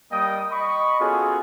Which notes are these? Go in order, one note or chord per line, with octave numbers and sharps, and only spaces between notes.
G3 A#3 D#5 G5 D#6
D#5 B5 C#6
B3 C#4 F4 F#4 G#4 A4